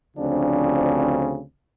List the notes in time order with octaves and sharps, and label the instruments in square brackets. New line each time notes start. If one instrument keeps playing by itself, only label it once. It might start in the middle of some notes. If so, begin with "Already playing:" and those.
[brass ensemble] D2 C#3 F3 C4 D4